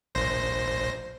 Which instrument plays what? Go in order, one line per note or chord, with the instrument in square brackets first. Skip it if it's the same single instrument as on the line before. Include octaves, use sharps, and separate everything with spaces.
[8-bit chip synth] A#1 C5 A#6